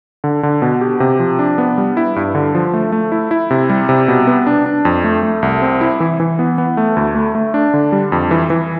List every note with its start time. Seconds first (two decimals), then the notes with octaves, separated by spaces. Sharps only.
0.24 D3
0.43 D3
0.62 B2
0.81 G4
1.00 C3
1.20 F3
1.39 D4
1.58 B3
1.78 G3
1.97 E4
2.16 G2
2.35 D3
2.55 F3
2.74 A3
2.92 A3
3.12 E4
3.31 E4
3.50 C3
3.70 G3
3.89 C3
4.08 B2
4.27 B3
4.47 D4
4.66 D4
4.85 F2
5.04 A3
5.23 A3
5.42 C2
5.62 C4
5.81 E4
6.00 E3
6.20 E3
6.39 B3
6.58 B3
6.77 A3
6.97 D2
7.15 A3
7.35 A3
7.54 D4
7.74 D3
7.92 G3
8.12 F2
8.31 E3
8.50 E3